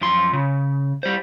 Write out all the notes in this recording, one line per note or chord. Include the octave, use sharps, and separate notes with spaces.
F#2 F3 C6
C#3
G3 C5